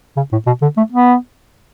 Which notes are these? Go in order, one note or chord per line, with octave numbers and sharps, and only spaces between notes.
C#3
A2
B2
D3
A3
B3